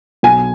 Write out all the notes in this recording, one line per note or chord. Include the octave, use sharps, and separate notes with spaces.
B1 G#5